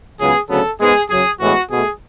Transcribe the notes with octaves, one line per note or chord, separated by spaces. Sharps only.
C#2 C#3 F#3 B3 G#4
D2 C#3 F#3 B3 A4
G#2 G#3 B3 G#4
F#2 C#3 F#3 G#4
A2 E3 G#3 B3 F#4
B2 A3 G#4